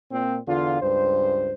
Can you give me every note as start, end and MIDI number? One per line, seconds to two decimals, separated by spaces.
0.11 0.38 46
0.11 0.38 60
0.47 0.78 40
0.47 0.78 50
0.47 0.78 65
0.82 1.54 37
0.82 1.54 43
0.82 1.54 72